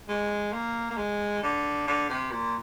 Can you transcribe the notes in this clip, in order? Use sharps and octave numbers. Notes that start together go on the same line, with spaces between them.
G#3
A#3
A#3
G#3
D3
D3
C3
A#2